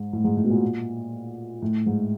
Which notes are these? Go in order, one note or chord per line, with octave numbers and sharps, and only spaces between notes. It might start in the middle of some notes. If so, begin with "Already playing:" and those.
Already playing: G#2
A2
G#2
A2
B2
A#2
A2
G#2